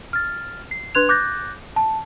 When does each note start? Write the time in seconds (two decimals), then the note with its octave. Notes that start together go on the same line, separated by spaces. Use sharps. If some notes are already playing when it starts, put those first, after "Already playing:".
0.13 F6 A6
0.71 C7
0.95 D4 B4 C6 F#6 G#6 F7
1.09 D6 F#6 G6 A6 A#6
1.76 A5